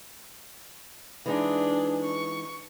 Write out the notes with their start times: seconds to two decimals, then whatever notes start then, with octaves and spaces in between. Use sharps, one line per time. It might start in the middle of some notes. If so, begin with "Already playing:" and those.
1.26 E3 G#3 D4 D#4 G#4
2.04 C#6